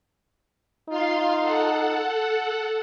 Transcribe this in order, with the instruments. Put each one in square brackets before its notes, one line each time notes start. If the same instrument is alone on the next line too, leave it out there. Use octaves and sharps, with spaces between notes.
[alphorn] D#4 [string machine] F4 F5 C6
[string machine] A4 F#5